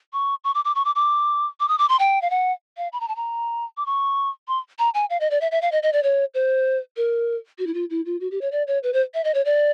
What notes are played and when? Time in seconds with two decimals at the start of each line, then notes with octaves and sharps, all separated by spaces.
0.13 C#6
0.44 C#6
0.55 D6
0.65 D6
0.75 C#6
0.85 D6
0.95 D6
1.60 D6
1.68 D#6
1.79 D6
1.89 C6
1.99 G5
2.22 F5
2.30 F#5
2.77 F5
2.93 B5
3.00 A#5
3.08 A5
3.16 A#5
3.77 D6
3.86 C#6
4.48 C6
4.79 A#5
4.94 G#5
5.10 F5
5.20 D#5
5.31 D5
5.41 E5
5.52 E5
5.62 F5
5.72 D#5
5.83 D#5
5.93 D5
6.03 C#5
6.34 C5
6.97 A#4
7.59 F#4
7.67 E4
7.74 F4
7.90 E4
8.06 F4
8.20 F#4
8.31 G4
8.41 C#5
8.52 D5
8.67 C#5
8.83 B4
8.93 C5
9.14 E5
9.24 D#5
9.34 C#5
9.45 D5